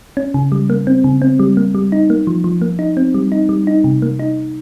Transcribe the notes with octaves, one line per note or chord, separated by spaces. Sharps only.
C#4
C#3
G3
A#3
C4
C#3
C4
G3
A#3
G3
D#4
A#3
F3
F3
A#3
D#4
C4
G3
D#4
G3
D#4
C3
A#3
D#4